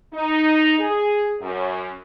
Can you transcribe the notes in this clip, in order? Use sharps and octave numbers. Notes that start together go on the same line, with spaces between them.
D#4
G#4
F#2